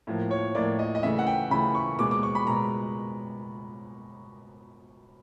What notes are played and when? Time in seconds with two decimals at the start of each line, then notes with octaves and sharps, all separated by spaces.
0.07 A2 F3 A#3
0.31 C#5
0.55 A2 F3 A#3 D5
0.79 D#5
0.95 D#5
1.03 C#3 E3 A3 E5
1.19 F#5
1.27 G5
1.51 C#3 E3 A3 B5
1.75 C#6
1.99 B2 G#3 D6
2.11 D6
2.23 C#6
2.35 B5
2.47 B2 G#3 A#5